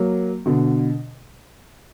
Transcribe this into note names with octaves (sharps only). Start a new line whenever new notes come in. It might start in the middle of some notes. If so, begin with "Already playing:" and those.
Already playing: F#3 A#3
B2 D3